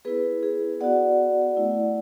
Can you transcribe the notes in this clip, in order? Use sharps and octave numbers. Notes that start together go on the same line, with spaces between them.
B3 E4 G#4 B4
G#4
B3 F#4 D5 F#5
A3 E4